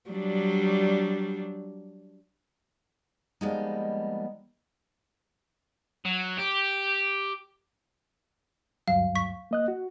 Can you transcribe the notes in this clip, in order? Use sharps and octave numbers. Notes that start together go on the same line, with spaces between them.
F#3 G3 D4
F3 G3 G#3 A#3 B3 D#4
F#3
G4
D2 G2 F#3 F5
C#6 B6
A#3 D#5 F#6
F#4